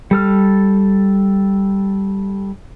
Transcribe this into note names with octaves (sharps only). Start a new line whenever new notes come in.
G3 A4 F6